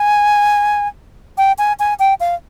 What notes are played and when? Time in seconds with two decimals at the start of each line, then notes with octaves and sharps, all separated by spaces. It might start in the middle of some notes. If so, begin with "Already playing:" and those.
Already playing: G#5
1.38 G5
1.58 G#5
1.80 G#5
1.99 G5
2.20 F5